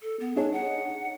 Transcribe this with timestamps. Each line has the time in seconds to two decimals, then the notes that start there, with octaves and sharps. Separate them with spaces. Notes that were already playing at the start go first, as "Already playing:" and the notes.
0.01 A4
0.20 B3
0.36 D4 D#4 G#4 C#5
0.52 F#5